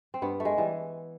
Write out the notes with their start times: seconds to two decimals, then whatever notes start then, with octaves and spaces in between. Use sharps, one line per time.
0.14 C4
0.22 G2 B3
0.40 A3
0.45 G#3
0.58 E3 G3